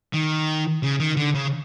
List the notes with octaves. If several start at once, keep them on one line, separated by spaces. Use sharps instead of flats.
D#3
C#3
D#3
D3
C#3